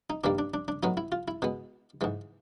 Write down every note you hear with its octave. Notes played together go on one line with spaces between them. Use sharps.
D#4
G2 D#3 G3 A#3 D4
D4
D4
D4
A2 F#3 B3 D#4
E4
F4
E4
B2 G#3 B3
G#2 E3 G#3